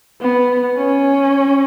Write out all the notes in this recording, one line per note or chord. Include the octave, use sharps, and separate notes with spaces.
B3
C#4